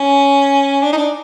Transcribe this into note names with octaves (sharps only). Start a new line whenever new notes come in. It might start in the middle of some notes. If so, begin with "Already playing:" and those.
Already playing: C#4
D4
D#4
D4